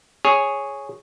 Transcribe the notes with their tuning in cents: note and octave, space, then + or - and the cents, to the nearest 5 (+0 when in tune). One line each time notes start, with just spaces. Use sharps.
G#4 +0 C#5 +0 G#5 +0